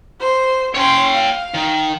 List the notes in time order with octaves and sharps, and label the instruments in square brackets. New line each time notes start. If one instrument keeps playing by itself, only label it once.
[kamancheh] C5
[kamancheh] C#4 C6 [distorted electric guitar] C#5 G5
[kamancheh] F5
[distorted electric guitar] D#3